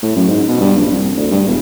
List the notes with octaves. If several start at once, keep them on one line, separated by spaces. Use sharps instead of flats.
A2
F#2
G#2
B2
G2
A#1
C2
D2
G2
E1